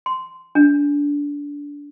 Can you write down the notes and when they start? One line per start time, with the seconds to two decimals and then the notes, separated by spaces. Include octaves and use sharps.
0.06 C6
0.55 D4